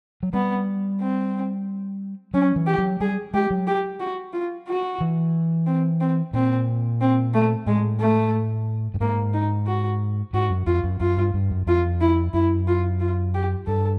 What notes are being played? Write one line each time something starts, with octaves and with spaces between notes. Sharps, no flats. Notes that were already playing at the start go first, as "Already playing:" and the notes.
F#3
G3 B3
C4
F#3 C#4
E3
G4
F#3
G3 G#4
G#3 G4
F#3
G4
F#4
F4
F#4
E3
C4
C4
A#2 C4
C4
A3
A2 G#3
A3
G2
G#2 A#3
D#4
F#4
G#2 F#4
F#2
F2 F4
F#2
F#2 F4
G2
G2
F#2
F2 F4
E4
F#2 E4
F4
F4
G4
G2 A4